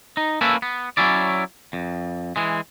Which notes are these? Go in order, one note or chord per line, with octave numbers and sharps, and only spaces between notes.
D#4
A#3 C#4 E4 A4 B4
B3
F#3 C#4 E4 D5
F2
E3 G#3